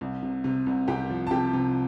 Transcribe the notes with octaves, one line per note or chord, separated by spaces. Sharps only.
C2
C3
C3
C2
C2 G4 G5
F3
A5
C3 G4 G5
C3